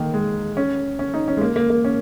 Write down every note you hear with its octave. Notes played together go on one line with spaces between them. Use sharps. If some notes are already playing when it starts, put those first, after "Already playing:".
Already playing: D#3 A#3
G#3
C#4
C#4
D#4
C#4
G#3
A#3
A#3
A#3
C#4